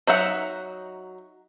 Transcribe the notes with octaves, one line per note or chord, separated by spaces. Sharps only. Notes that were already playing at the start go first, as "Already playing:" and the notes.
F#3 D#4 E5 F#5